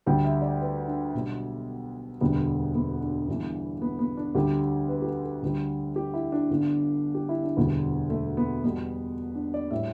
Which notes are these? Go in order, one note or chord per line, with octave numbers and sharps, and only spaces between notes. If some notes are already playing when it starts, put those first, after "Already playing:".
D2 D3 G3 G5
E5
D5
B4
D4
B1 B2 G3
E1 D2 D3 G3 B3
B3
D4
G1 G2 E3
B3
B3
D4
D2 D3 G3 G4
B4
G4
A4
A4
D2 D3 G3
G4
E4
D4
G1 G2 D3
G4
E4
D4
E1 D2 D3 G3 B3
A3
B3
E2 B2 G3 B3
D4
D5
A2 G3 E5